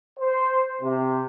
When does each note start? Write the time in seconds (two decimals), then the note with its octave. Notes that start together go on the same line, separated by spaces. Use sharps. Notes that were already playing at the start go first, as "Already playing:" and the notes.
0.19 C5
0.82 C3